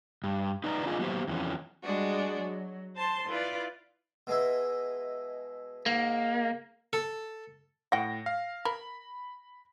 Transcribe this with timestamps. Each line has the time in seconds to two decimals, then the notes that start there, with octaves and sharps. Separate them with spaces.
0.24 G2
0.64 D#4 B4 D5 G#5 A#5
0.86 D4 F4 G#4 A#4 D#5
0.99 F#3 A#3 B3 G4 C5
1.27 F2 E3 C#4
1.83 G3 G#3 D4 F#4
2.37 F#3
2.96 C5 A5 C6
3.27 E4 F4 B4 D5
4.27 B2 G#3 E4
5.86 G#2 A#3
6.93 A4
7.92 A2 F#5 G5 A#6
8.26 F5
8.65 A#4 B5